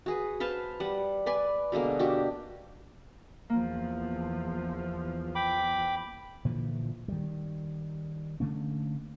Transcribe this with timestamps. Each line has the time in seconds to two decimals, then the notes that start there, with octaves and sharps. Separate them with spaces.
0.06 F#4 G#4 B4
0.40 B4 C5 F5 A5
0.80 G3 F#5
1.26 B4 D5 G#5
1.72 B2 D3 G#3 A#3
1.99 D4 F#4 G4
3.50 E2 F3 A#3
5.35 G5 B5 D6
6.45 A#2 D3 E3 F3
7.08 D#3 G3
8.40 D3 A3 A#3 C#4